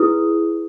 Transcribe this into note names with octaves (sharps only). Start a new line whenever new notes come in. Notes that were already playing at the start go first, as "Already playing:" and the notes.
Already playing: E4 G#4 B4 D#6